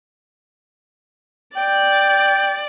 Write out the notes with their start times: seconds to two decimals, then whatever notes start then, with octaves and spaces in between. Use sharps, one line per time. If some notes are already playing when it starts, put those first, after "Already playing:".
1.57 D5 G5